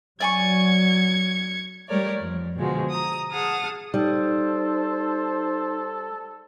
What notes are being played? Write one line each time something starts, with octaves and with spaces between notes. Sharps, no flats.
F#3 D5 G#5 C#6 G#6 C#7
G3 A3 A#4 C#5 D5
F2
B2 D3 F3 G#3 F#4
A#5 D#6
G#4 F#5 A5 D#6 F6
G3 D#4 A4 C5